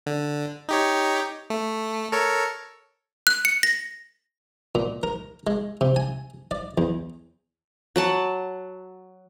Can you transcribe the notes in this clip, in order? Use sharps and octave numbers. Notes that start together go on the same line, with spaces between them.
D3
D#4 G4 C#5
A3
A4 A#4 C#5
F#6
C#7
A#6
A#2
A#4
G#3
C3
G#5
D5
E2
F#3 F#5 A5